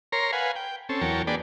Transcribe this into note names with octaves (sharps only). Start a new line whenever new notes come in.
A#4 C#5 A#5 C6
B4 F5 F#5 G#5
G5
C4 C#4 A4
E2 F#3 A#4 C#5 G5 A5
A#3 D4 G#4 B4 D5 G5